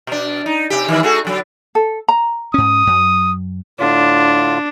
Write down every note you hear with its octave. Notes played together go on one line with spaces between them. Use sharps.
B2 D4
D#4
C3 G4
D#3 E3 G3
A3 F#4 G#4
D3 F#3
A4
A#5
G#2 C#4 D#6
F#2 F#3
A2 D3 D4 F4